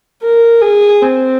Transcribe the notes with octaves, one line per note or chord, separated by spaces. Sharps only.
A#4
G#4
C4